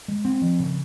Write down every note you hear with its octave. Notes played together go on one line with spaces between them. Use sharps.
G#3
C4
F3
C#3